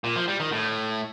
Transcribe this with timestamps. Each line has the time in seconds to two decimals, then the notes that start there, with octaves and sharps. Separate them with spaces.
0.04 A#2
0.16 F3
0.28 G3
0.40 D#3
0.52 A2